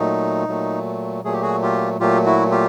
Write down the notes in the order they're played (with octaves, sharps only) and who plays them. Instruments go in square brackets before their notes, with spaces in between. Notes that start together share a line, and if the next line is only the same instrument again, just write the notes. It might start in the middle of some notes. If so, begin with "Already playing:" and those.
Already playing: [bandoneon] A#2 F#3 A3 D#4
A#2 F#3 A3
A#2 F#3 A3 G#4
G4
F#4 G#4
F4 G4
A#2 F#3 A3 F4 G4
E4 F#4
F4 G4